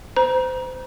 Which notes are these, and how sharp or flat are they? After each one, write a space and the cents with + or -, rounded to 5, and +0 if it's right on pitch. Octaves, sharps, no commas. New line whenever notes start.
C5 -25 A#5 +30